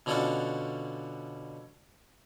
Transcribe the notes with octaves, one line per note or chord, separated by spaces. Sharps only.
B2 D3 C#4 F4 F#4 A4